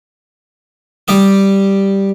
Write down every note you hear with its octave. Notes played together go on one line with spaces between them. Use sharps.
G3 G4 D#6